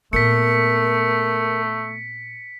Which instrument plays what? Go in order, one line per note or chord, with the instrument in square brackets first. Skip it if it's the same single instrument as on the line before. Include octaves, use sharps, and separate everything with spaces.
[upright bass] A#2 B3 [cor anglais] A3 [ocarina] A#4 [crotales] B6 C#7